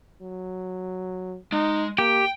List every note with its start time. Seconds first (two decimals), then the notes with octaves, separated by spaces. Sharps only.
0.22 F#3
1.52 G#3 D#4
1.98 A#3 G4 G5